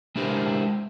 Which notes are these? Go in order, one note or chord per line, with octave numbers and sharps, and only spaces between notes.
G#3 D4 E4 G4 A#4 C5